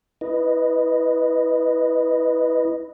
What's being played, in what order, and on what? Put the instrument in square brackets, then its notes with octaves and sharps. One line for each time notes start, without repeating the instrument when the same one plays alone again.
[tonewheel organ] E4 B4 D#5